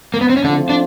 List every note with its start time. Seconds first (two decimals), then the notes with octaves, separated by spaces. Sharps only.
0.14 A#3
0.21 B3
0.29 C4
0.37 C#4
0.44 A2 D3 F3 A3 C4 D4 F4
0.69 D4